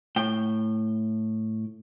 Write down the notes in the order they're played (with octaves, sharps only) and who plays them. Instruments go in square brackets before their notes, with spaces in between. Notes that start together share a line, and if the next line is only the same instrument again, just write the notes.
[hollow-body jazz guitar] A2 G5